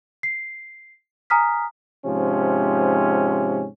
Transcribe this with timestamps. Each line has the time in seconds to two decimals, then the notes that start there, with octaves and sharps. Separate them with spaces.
0.23 C7
1.30 G#5 A#5 D#6 F6 B6
2.06 G#2 C3 F3 C#4